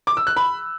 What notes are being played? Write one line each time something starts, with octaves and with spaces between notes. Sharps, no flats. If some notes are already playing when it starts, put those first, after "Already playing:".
D6
E6
F#6
B5